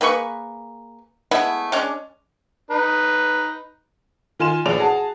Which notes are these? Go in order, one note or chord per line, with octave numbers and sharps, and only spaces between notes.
A#3 G#4 B4 C#6
G#3 A3 B3 E4
G#3 C#4 D4
D#4 B4
D#3 F4 G#5 C6 E7
A#1 E3 G#4 C#5 D5 F7
F#4 G#4 A5